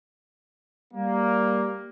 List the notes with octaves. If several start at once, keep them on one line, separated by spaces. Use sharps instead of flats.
G3 A#3